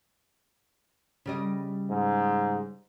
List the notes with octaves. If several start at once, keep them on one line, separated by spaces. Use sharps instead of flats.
C#3 G3 D#5
G#2